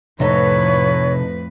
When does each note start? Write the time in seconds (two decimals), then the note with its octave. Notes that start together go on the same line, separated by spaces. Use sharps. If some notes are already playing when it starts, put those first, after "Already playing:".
0.20 F2 A2 C3 D#4 A4 B4 C#5